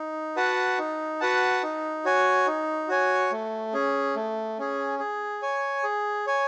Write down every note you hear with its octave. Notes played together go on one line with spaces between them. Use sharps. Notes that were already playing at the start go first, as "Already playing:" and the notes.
Already playing: D#4
F#4 B4 F#5 A5
D#4
F#4 B4 F#5 A5
D#4
F#4 C#5 G#5
D#4
F#4 C#5 G#5
A3
C#4 G#4
A3
C#4 G#4
G#4
C#5 G#5
G#4
C#5 G#5